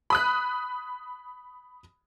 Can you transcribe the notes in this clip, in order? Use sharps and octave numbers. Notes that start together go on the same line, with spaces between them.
B5 D#6 F#6